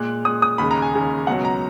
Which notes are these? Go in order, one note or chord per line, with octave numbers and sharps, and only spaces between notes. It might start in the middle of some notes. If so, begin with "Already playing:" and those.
Already playing: A#2 G#3 F#6
A#2 G#3 D#6
D#6
D#2 C#3 G#3 B5
A#5
G#5
D#2 C#3 G#3
C#2 B2 F#3 F#5
A#5